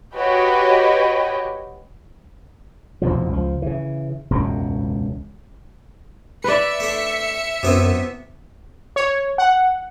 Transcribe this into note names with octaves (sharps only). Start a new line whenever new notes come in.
F#4 G4 B4 C#5 D#5 G5
F1 E2 B2 F3
C#2 F3
C#3 E3
E1 C#2 F#2 C#3
B4 D5 E5 C#7
A3 D4
F#2 C3 B3 E4
C#5
F#5